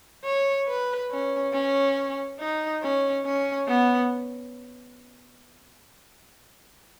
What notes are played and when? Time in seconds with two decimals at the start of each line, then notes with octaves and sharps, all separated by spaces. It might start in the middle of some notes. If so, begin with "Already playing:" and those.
0.24 C#5
0.67 B4
1.11 C#4
1.53 C#4
2.39 D#4
2.82 C#4
3.25 C#4
3.68 B3